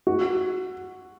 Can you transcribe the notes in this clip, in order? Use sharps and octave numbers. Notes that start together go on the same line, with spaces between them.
F#4